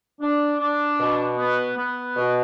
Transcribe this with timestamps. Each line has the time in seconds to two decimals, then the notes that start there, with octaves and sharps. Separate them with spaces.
0.20 D4
0.60 D4
0.99 B2
1.38 B3
1.77 B3
2.16 B2